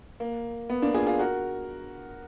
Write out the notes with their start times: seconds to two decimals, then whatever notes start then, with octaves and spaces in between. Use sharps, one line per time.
0.20 A#3
0.70 B3
0.82 A#3 D4
0.94 F4 G#4
1.07 F4 G#4
1.19 F#4 A#4